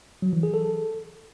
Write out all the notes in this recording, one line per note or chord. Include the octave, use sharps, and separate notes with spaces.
F#3
E3
G#4
A4